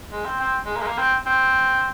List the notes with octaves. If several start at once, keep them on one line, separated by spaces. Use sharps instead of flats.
G#3
C4
C4
G#3
A#3
G#3
A#3
C4
C4